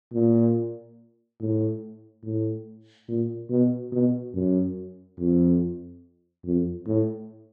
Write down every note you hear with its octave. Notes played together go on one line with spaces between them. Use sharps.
A#2
A2
A2
A#2
B2
B2
F#2
F2
F2
A2